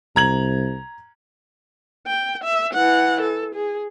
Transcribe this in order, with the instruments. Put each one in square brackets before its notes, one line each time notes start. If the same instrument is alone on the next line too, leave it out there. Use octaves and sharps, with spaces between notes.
[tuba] C2 [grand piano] A#5 G#6 F#7
[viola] G5
E5
E3 F#5
A4
G#4